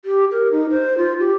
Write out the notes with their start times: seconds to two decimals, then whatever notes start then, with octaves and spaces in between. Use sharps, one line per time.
0.05 G4
0.31 A#4
0.51 D#4
0.70 C5
0.98 F4
1.20 G4